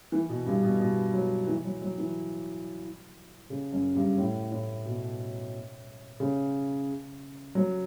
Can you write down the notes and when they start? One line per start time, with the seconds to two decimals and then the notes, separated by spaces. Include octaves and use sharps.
0.12 E3
0.29 B2
0.46 G2
0.63 B2
0.80 B2
1.14 F#3
1.47 E3
1.64 F#3
1.82 F#3
1.98 E3
3.50 C#3
3.72 F#2
3.95 G2
4.18 A2
4.51 A2
4.85 B2
6.20 C#3
7.55 F#3